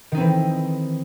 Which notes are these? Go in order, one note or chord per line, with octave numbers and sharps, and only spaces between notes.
D#3 E3 C4 D#4